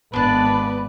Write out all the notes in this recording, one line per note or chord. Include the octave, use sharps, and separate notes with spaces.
G#1 B3 D4 B4 D5 A5